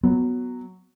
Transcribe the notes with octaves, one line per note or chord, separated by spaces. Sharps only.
F#3 B3